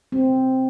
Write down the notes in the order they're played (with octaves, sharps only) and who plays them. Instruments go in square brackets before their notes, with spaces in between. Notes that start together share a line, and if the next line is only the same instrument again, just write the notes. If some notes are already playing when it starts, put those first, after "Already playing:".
[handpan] C4